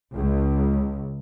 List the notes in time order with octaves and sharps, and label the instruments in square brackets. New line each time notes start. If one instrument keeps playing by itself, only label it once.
[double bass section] C#2